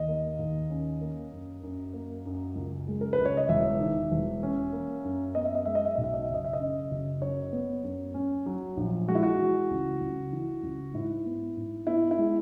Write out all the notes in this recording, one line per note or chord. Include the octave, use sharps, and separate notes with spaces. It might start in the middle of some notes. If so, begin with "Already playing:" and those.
Already playing: D#2 D#5
A#3
D#2
C#4
A#3
F#2
F#2
A#3
F#2
C#2
G#3
A#4
C#2 B4
C#5
D#5
E1 E5
D#3
E1
C#4
A#3
F#2
B3 D#5
E5
D#5
G#3 E5
D#5
E5
B1 D#5
E5
D#5
F#1 E5
D#5
E5
D#5
C#3
F#1
F#2 C#5
B3
F#2
C#4
F#3
A#1
G#3 F#4
E4
F#4
E3
C#2
C#2
E3
C#2
G#2 E4
B3
G#2
B3 E4
E4
G#3